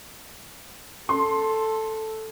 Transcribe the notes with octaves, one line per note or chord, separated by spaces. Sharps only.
A4 C6